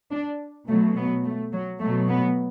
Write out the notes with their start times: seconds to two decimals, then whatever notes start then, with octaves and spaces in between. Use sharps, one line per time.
0.11 D4
0.67 B2 F#3 A3
0.96 B3
1.24 A3
1.52 F#3
1.80 B2 F#3 A3
2.08 B3